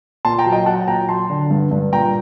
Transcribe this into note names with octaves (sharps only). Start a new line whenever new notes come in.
A#2 A5 C6
G5 A#5
F#3
D#5 G5
F#3 F#5 A5
A#2 G5 A#5
F#3 A5 C6
D3
G2
G2
A#2 G5 A#5